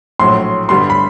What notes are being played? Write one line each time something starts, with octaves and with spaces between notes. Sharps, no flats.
A#1 A2 F#3 C6
G2 D3 G3 B3 C6
B5